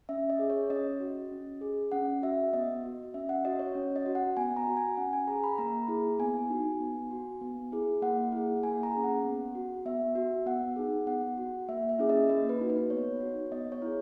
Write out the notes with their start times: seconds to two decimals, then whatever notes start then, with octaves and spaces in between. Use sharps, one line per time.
0.09 C#4 E5
0.30 D#5
0.39 G#4
0.50 C#5
0.70 C#4 D#5
1.00 F#4
1.31 C#4
1.61 G#4
1.92 C#4 F#5
2.22 F#4 E5
2.53 B3 D#5
2.84 F#4
3.14 C#4 E5
3.29 F#5
3.45 F#4 D#5
3.59 C#5
3.75 C#4
3.96 D#5
4.06 F#4
4.15 F#5
4.37 B3 G#5
4.57 A#5
4.67 F#4
4.77 G#5
4.97 C#4 F#5
5.13 G#5
5.27 G#4 A#5
5.44 B5
5.58 A#3 A#5
5.88 E4 G#4
6.19 B3 G#5
6.50 D#4 F#4
6.80 B3
7.11 F#4
7.41 B3
7.72 E4 G#4
8.02 A#3 F#5
8.32 E4 G#4
8.63 A#3 G#5
8.83 A#5
8.94 C#4 G#4
9.04 F#5
9.25 B3
9.55 F#4
9.86 B3 E5
10.15 F#4
10.46 B3 F#5
10.76 D#4 G#4
11.07 B3 F#5
11.38 F#4
11.68 A#3 E5
11.89 E5
11.99 C#4 E4 G#4
12.09 D#5
12.29 A#3 D#5
12.49 B4
12.59 D#4 F#4
12.70 B4
12.90 B3 C#5
13.20 F#4
13.25 D#4
13.52 B3 D#5
13.72 C#5
13.82 E4 G#4